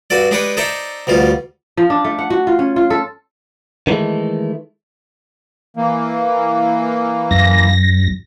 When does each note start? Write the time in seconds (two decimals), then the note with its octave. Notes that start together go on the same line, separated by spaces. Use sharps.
0.10 G2 F#4 A4 D5
0.31 G#3 D4 G4 B4 C#6 D#6
0.57 D#4 A4 C5 D5 E5 C#6
1.07 D2 B2 G3 F4
1.77 F3
1.90 D4
2.05 A3
2.19 F#5
2.30 F#4
2.47 F4
2.59 C#4
2.76 F4
2.90 A4
3.87 D#3 E3 F#3 G#3 A3
5.77 E3 A#3
7.31 F#2 A#6